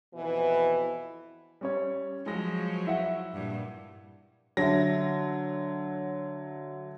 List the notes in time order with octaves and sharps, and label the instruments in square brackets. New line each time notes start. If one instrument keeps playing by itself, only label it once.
[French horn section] F2 B2 E3
[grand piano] G3 C#4 C#5
[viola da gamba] F3 F#3 [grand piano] G#3 A#6
[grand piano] E4 E5 F#5
[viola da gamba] G2 A#2
[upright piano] D3 E5 [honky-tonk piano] F#3 A#6